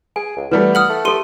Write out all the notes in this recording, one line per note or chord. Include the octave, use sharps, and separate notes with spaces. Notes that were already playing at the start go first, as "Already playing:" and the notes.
G#4 G#5
C#2
E3 G3 A3 B3 B4
F#5 D#6 F6 F#7
A3
G4 A4 C6 D#7